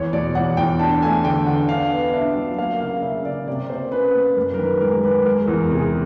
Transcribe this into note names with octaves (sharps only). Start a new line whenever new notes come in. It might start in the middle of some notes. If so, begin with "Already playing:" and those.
Already playing: E2 C#5
B2 D5
E2 F#5
E2 G5
D4 A5
A3 G#5
D3 G5
D4 F#5
D4 F5
B3
D4 E5
F#3
A#3 F5
C#3 F5
C#3 E5
C#3 D5
C3 D5
A#3 C5
C#4 B4
A#3
F#2 A#4
A#4
D#3 B4
G#3 A#4
G#3 B4
G#3 A#4
E2
C3 G#4